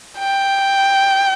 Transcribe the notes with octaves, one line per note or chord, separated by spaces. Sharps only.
G5